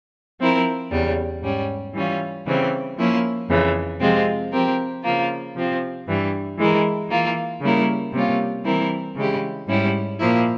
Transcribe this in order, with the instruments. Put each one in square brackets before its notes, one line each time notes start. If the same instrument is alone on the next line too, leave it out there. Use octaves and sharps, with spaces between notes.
[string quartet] F3 C4 E4 A#4
E2 C#3 G3
G#2 G3 C#4
E3 G3 C#4 F4
C#3 E3 G3 C4
F3 A#3 C#4 E4
F2 C#3 E3
C3 F3 G#3 C4 F4
F3 C4 G4 A#4
C#3 F3 A#3 F4
C3 F3 C4 F4
G2 E3 G3
E3 G#3 E4 A#4
E3 A#3 F4
C#3 G3 A#3 E4 A#4
C3 G3 A#3 C#4 F4
E3 G3 C4 E4 A#4
C#3 E3 G#3 E4 G4
G#2 G3 C#4 E4 G4
A#2 F3 A#3 E4